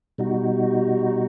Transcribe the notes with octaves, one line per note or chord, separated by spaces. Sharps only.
B2 G3 D#4 F#4